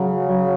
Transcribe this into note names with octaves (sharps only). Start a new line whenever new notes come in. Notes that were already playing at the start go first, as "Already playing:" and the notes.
Already playing: C#3 F#3
F#3